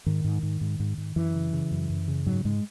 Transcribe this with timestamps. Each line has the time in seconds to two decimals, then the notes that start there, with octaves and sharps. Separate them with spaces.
0.06 G#2 D#3
0.24 G#2
0.43 G#2
0.61 G#2
0.80 G#2
0.98 G#2
1.16 F#2 E3
1.34 C#3
1.53 C#3
1.71 F#2
1.90 F#2
2.08 C#3
2.26 G#2 F#3
2.45 G#2 G#3